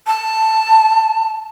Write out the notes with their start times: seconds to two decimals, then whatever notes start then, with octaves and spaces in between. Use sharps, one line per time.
0.07 A5